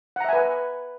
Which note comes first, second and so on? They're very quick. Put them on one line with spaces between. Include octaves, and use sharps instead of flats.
F#5 A#5 E5 G#5 B4